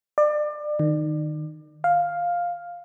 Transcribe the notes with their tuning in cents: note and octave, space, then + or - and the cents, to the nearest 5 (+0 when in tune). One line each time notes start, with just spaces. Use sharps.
D5 +30
D#3 -20
F5 +5